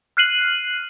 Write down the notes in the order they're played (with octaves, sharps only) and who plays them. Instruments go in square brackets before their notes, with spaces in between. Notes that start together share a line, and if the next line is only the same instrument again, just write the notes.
[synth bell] F6 F#6 C7 D#7 F#7